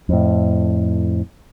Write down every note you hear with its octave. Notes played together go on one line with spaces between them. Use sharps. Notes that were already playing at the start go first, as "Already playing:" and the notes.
F2 A2